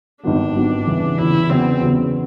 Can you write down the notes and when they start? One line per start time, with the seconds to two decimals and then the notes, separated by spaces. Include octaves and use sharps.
0.23 G#1 G2 D#3 F#3 B3 D4
0.55 G#1 G2 D#3 F#3 B3
0.87 E2 C#3 E3
1.18 E2 C#3 E3 E4
1.50 E2 C#3 F#3 B3 C4
1.81 E2 C#3 F#3 B3